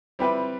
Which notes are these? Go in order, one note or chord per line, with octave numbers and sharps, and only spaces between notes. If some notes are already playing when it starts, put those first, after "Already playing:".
G3 C4 E4 G4 B4